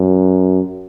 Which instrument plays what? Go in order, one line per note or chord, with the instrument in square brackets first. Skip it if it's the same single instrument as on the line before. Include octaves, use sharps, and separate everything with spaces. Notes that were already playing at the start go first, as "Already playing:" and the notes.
Already playing: [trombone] F#2